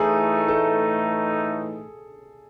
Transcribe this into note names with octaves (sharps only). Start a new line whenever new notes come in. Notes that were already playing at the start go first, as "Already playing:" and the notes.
Already playing: A2 E3 A3 D#4 G#4
A4